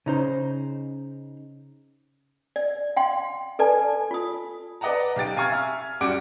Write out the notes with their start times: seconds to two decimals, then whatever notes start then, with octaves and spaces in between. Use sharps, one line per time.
0.06 C#3 D#4 C5
2.56 D5
2.96 F5 G5 C6
3.59 A4 B4 D5 G#5 A5
4.11 F4 D#6
4.81 B4 D5 D#5 F#5 A5 A#5
5.16 B1 G4 A6 D7
5.36 F5 G#5 A#5 C#6 F6 G#6
5.50 E5 F6
6.01 F#2 G3 F#4 D6 D7